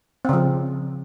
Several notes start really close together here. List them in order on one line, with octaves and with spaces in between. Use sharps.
C4 C#3 F3